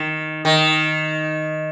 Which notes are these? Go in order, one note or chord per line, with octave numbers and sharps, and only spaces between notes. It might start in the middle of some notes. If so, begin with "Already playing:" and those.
Already playing: D#3
D#3